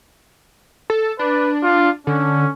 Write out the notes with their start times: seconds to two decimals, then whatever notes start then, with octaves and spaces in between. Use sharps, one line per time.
0.90 A4
1.19 D4 B4
1.63 F4
2.07 D3 C#4